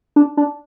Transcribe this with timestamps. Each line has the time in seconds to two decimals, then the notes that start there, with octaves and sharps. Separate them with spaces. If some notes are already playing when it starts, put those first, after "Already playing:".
0.16 D4
0.37 D4